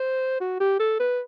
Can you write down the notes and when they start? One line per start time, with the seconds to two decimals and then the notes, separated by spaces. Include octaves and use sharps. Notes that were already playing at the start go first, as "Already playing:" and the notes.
Already playing: C5
0.41 F#4
0.60 G4
0.80 A4
1.00 B4